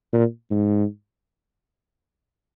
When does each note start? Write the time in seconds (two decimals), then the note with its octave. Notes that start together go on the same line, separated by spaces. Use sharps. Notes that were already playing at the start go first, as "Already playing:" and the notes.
0.13 A#2
0.51 G#2